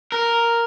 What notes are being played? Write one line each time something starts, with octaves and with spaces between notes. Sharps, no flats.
A#4